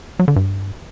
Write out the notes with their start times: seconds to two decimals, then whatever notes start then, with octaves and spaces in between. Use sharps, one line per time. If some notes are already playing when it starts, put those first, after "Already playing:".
0.19 F#3
0.28 D3
0.36 G2